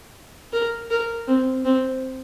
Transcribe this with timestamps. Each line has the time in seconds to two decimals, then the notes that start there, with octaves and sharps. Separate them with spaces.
0.53 A#4
0.91 A#4
1.28 C4
1.65 C4